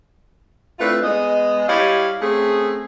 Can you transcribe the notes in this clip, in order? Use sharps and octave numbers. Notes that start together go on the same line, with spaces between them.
A3 C4 D4 E4 F4 B4
G#3 B3 G#4 D#5
G3 E4 G4 C#5 D#5 F5
A3 C4 C#4 G#4